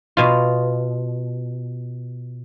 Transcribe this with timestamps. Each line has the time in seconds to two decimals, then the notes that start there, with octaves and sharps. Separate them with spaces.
0.17 B2 F4